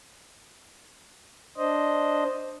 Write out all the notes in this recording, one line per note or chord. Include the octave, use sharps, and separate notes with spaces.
D4 C5 D#5